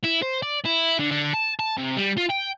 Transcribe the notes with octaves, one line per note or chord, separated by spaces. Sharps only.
E4
C5
D5
E4
D3
D3
A5
A5
C3
G3
F4
G5